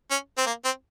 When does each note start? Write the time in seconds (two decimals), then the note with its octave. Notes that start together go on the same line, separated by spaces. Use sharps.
0.11 C#4
0.38 C4
0.46 A#3
0.64 C4